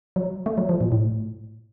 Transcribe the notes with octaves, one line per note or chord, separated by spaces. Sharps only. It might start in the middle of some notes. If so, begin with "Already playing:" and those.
F#3
A3
F#3
F3
A#2
A2